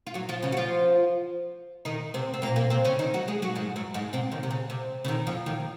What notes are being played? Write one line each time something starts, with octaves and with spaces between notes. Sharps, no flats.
F4
F#3 F#4
F3 F4
C#3 C#4
F#4
F3 F4
D#3 D#4
C3 C4
C4
A#2 A#3
A#2 A#3
C3 C4
C#3 C#4
D#3 D#4
F#3 F#4
G#3 G#4
F#3 F#4
G#2 G#3
F#2 F#3
G#2 G#3
C3 C4
D#2 D#3
C3
C#3
C3
C#3
D#2 D#3
F2 F3
D#2 D#3